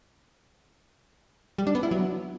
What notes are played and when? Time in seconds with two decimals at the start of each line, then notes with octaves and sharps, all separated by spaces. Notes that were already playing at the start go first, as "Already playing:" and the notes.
1.58 G3
1.67 D4
1.75 B3
1.83 E4
1.91 F#3